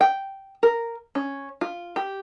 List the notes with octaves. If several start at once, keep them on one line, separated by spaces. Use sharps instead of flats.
G5
A#4
C#4
F4
G4